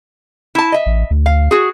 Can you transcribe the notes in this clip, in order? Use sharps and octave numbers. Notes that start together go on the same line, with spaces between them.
E4 A5
D#5 E5
A1
D2
F5
F#4 G#4